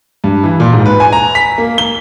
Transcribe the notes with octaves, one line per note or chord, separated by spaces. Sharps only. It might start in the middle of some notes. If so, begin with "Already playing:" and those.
G2
E3
A#2
G#2
B4
G#5
A#5
B6
A#3
G7